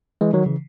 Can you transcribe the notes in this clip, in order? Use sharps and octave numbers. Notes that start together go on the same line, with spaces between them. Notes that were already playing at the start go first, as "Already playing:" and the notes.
E3 G#3
D#3 F#3
C#3 E3